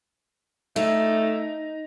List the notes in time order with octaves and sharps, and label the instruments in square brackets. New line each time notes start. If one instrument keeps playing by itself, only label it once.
[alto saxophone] A3 [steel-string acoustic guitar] D#4